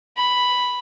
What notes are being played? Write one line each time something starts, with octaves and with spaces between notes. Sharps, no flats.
B5